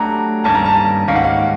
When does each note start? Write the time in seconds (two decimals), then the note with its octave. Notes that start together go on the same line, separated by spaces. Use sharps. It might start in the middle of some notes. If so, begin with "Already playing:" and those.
Already playing: F#3 A3 D4 G4 A#5
0.44 G2 D#3 G3 A#3 C#4 A5
0.55 A#5
0.66 A5
1.07 G#2 D#3 G3 A#3 C#4 F5
1.15 F#5
1.24 F5